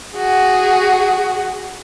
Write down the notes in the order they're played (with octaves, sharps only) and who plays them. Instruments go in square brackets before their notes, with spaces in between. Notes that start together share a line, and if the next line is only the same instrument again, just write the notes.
[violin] F#4 G#4